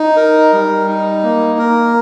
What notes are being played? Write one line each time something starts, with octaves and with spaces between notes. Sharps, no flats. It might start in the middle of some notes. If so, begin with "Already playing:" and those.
Already playing: D#4
A#4
G3
D#4
A#3
A#4